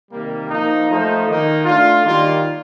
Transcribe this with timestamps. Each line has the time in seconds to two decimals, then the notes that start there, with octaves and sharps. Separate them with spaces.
0.12 C3 D#3 G3 A#3
0.50 F3 A#3 D#4
0.88 F3 A3 D#4 A4 C5
1.26 D#3 A#3 D#4
1.65 A3 D4 F4
2.04 D#3 G3 A#3 F4